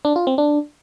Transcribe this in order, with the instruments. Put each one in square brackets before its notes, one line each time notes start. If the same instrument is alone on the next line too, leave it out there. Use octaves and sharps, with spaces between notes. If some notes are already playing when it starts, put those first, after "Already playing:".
[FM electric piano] D4
F4
C4
D4